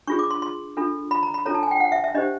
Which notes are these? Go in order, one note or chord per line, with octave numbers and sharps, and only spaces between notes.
D4 F4 G#4 C#6
D6
C6
C6
D4 F4 A4
B5
A#5
B5
D4 F4 A4 C#5 A#5
A5
G#5
G5
F#5
E5
E5
D4 G4 C5 D#5